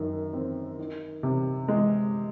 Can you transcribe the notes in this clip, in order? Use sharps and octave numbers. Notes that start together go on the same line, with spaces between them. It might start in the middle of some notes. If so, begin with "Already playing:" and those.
Already playing: F#2 D#3
C4
D#3
C3
G#3